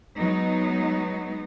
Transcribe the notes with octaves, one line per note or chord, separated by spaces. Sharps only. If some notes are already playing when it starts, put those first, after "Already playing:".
F#3 G#3 B3 D#4